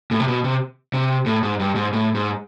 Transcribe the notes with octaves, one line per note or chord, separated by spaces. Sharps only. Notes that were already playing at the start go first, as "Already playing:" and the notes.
A2
C3
B2
C3
C3
A2
G#2
G2
G#2
A2
G#2